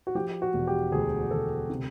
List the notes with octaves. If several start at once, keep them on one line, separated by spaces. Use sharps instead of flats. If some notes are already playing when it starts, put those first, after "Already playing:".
F#4
F3 G4
F#4
E1
G4
D2 G#4
D2 A4
C3